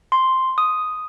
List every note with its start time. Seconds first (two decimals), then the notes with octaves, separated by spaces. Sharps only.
0.12 C6
0.58 D#6